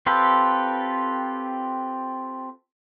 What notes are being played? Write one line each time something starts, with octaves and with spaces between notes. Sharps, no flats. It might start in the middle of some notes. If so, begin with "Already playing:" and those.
C4 F4 G4 A4 B4